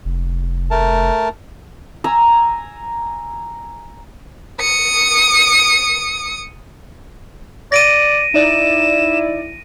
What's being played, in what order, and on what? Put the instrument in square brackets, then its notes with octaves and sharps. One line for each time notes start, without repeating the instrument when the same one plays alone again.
[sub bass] F1
[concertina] A3 A#4 A5
[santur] G#5 A#5 E6
[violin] D#6 C#7
[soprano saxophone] D5 [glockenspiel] A#6 D7 D#7
[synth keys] D#4 D5 [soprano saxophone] E4 [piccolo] E7